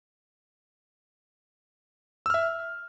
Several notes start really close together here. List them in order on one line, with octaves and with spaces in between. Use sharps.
E6 F6 E5